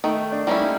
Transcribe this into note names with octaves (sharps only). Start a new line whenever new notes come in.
D#3 A3
D4
G3 A#3 C#4 E4
D#4